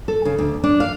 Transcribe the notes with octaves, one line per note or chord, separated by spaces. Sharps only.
A4
C#3
D2
D4
F5